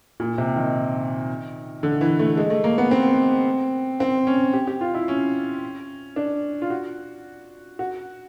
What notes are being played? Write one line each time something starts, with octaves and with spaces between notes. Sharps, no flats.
A#2
C3
D#3
D3
E3
A3
G#3
A3
A#3
B3
C4
C4
C#4
G4
G4
F4
E4
C#4
D4
F4
F#4
F#4